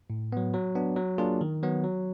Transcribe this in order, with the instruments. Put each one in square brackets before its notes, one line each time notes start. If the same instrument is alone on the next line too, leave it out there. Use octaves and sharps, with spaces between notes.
[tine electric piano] A2
F#3 B3
F#3
B3 D4
F#3
A#3 D4 F4 G#4
D#3
F#3 B3
F#3